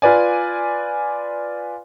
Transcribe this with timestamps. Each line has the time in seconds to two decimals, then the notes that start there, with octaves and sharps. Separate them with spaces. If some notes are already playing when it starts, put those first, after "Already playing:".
0.02 F4 B4 D5 G#5